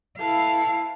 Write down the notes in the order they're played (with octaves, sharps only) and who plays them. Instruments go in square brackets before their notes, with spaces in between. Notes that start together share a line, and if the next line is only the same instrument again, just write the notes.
[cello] E4 F5 [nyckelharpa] A4 B4